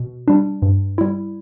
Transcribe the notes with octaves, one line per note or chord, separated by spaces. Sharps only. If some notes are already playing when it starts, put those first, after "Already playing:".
Already playing: B2
G3 D4
G2
G3 E4